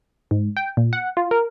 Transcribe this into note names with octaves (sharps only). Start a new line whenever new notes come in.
G#2
G5
A#2
F#5
F4
A#4